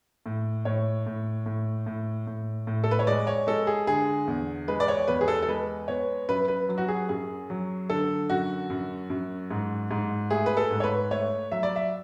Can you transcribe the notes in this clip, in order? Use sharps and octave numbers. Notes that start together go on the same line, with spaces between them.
A2
A2 C#5
A2
A2
A2
A2
A2
A4
B4
C#5
G#3 D5
C#5
G#3 A4
G#4
D3 G#4
E2
G#3 B4
D5
C#5
E2 B4
G#4
A4
A4
G#3 B4
B3 C#5
F#2 B4
B4
F#3
F#4
G#4
F#2 G#4
F#3
D3 A4
F#2 F#4
F#2
F#2
G#2
G#2
A3 G#4
B4
A4
G#2
C#5
B4
A3 C#5
F#3 E5
D5
E5